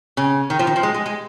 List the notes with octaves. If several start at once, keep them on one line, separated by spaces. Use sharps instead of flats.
C#3
D#3
F3
D#3
F3
G#3
G#3
G#3